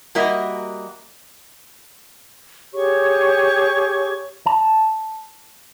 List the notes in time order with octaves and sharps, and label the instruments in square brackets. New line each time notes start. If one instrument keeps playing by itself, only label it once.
[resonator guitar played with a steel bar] G3 A#3 F#4 A#4 D#5 E5
[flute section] G4 G#4 C#5 C#6
[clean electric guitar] A5